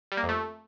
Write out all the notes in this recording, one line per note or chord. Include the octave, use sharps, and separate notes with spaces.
G3
A#3
F2
A3